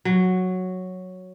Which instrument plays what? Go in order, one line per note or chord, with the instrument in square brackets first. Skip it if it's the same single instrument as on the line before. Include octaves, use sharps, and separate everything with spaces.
[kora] F#3